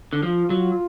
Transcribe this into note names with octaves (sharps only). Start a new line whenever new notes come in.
D3
F3 F4
F#3